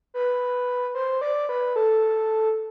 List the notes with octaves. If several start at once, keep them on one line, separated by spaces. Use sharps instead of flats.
B4
C5
D5
B4
A4